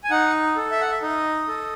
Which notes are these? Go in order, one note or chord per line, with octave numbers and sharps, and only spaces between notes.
G#5
D#4 F#5
A4
E5
F#5
E5
D#4 D#5
A4